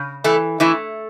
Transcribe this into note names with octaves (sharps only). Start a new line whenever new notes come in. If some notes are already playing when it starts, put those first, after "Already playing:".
Already playing: C#3
E3 A3 A4
E3 A3 E4